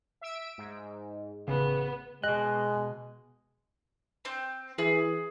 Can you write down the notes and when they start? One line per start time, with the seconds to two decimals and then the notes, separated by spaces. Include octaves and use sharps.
0.21 E5 E6 D7
0.58 G#2
1.48 A1 C#3 B3
2.24 B2 G#3 G#4 D#5 F#6
4.25 C4 G6
4.78 E3 G#4